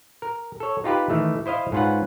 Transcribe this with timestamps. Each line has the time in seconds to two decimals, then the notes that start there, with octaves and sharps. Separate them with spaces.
0.22 A#4
0.60 A4 C#5
0.84 D#4 F4 G4 B4
1.10 D#3 E3 A3
1.46 E4 C5 D#5 F5
1.72 G#2 C#4 F4 B4 F#5